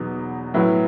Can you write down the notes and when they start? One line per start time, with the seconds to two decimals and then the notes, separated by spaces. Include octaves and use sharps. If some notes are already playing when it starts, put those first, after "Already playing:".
Already playing: E2 B2 F#3 B3 D#4
0.54 A2 F#3 B3 E4